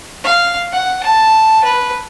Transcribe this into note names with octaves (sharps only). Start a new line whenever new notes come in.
F5
F#5
A5
B4